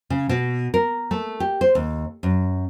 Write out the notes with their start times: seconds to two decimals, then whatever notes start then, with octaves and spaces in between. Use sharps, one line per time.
0.10 C#3
0.29 B2
0.74 A#4
1.11 A3
1.40 G4
1.61 C5
1.75 D#2
2.23 F#2